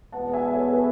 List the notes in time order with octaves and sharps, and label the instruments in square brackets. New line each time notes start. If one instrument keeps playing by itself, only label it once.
[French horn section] E2 B2 G#3 B3 [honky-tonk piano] F#5 A5
[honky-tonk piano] E5 G#5
A4 C#5
B4